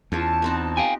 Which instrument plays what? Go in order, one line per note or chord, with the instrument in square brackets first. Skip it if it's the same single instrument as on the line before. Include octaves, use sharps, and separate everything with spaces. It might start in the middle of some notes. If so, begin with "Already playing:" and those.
[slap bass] E2 [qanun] C#4 F4 [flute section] A5
[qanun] B3 C4 D#4
[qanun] G4 [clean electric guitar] F5 G5 G#5